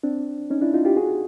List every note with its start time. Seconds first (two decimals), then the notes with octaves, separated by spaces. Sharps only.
0.03 C4 D4
0.50 C#4 D#4
0.61 D4 E4
0.74 D#4 F4
0.85 F4 G4
0.97 F#4 G#4